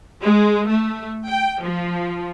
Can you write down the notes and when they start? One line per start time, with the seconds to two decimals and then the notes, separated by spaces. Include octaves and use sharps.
0.22 G#3
0.69 A3
1.28 G5
1.61 F3